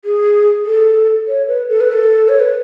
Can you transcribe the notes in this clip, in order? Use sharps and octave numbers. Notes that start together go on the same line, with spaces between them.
G#4
A4
C#5
B4
A4
B4
A4
C#5
B4